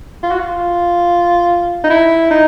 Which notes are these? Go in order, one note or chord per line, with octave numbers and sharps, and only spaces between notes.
F4
F#4
F4
D#4
E4
D#4